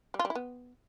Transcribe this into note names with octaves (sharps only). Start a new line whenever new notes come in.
G3
F4
G3
E4
B3